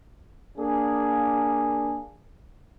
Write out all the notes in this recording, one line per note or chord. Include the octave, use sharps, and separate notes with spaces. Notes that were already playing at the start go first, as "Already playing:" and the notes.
A#3 D4 G#4